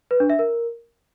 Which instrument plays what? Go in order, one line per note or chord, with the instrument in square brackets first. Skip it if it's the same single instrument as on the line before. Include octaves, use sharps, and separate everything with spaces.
[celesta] B4
D4
E5
A#4